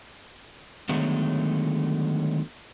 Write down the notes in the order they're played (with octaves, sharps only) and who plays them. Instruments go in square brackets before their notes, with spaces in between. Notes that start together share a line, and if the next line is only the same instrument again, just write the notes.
[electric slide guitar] D3 D#3 F#3 G#3 A3 B3